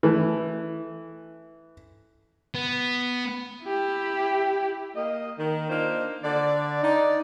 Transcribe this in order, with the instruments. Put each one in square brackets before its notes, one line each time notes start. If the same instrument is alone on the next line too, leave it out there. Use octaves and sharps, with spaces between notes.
[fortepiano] E3 A3
[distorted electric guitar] B3
[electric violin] E4 G4
[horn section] A#3 D#5
D#3
A#3 D4 D#4 F4 C5
D3 D5
D#4 D5